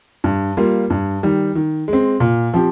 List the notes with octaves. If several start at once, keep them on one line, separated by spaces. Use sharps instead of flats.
G2
G3 A#3 F4
G2
D#3 G3
D#3
G#3 C4
A#2
F3 C4 G4